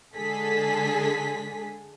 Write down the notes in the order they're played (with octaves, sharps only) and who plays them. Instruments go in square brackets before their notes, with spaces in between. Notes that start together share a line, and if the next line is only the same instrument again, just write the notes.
[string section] D3 G#3 G#4 A4 B6